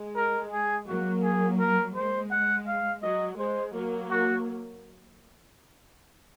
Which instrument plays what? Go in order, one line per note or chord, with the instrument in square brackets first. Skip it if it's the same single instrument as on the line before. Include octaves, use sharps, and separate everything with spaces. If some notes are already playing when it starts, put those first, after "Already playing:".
Already playing: [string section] G#3
[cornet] A#4
G#4
[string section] F#3 A#3 [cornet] F#4
[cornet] G#4
A#4
[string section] G#3 [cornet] C5
[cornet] F#5
F5
[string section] F#3 [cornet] D#5
[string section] G#3 [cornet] C5
[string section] F#3 A#3
[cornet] F#4